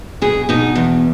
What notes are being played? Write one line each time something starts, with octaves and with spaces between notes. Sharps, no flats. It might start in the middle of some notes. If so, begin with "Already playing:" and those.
B2 G#4
B2 D#4
E2